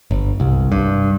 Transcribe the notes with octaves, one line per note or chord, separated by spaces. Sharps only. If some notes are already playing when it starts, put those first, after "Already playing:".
G1
C2
G2